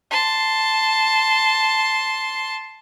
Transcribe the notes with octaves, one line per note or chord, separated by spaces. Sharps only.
A5 C6